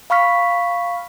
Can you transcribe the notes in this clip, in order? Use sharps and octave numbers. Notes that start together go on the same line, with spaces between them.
F5 B5 C#6 F6 B6